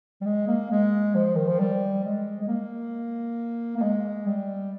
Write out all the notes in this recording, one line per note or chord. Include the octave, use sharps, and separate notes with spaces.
G3
G#3
A#3
G#3
F3
D#3
F3
G3
G#3
G#3
A#3
A#3
G#3
G3